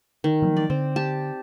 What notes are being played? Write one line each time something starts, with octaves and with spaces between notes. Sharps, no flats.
D#3
F3 F#3 A#3
D5
D3 C4
G4 A5